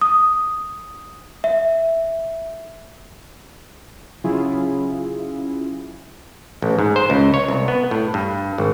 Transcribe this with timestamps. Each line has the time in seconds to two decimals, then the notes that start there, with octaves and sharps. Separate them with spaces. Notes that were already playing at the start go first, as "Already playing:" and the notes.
0.01 D#6
1.44 E5
4.24 C#3 F#3 C#4 E4 F4 G#4
6.62 A1
6.79 G#2
6.96 C5
7.10 C#2
7.34 C#5
7.49 C2
7.68 B3
7.91 A2
8.14 G2
8.58 G#1